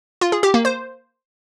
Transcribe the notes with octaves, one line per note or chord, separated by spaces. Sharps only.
F4
G#4
G4
A#3
C5